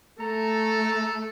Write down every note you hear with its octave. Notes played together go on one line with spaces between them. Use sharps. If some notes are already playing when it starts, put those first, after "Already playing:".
A3 A4 A#5